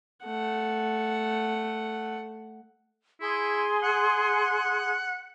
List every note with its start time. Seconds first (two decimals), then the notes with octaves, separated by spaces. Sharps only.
0.25 A3 F#5
3.21 E4 G#4 C6
3.83 F#5